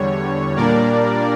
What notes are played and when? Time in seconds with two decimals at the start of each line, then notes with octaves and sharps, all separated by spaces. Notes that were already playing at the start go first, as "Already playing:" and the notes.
Already playing: E2 D3 G3 C#5
0.57 A#2 G3 A#3 D4 A#4 D5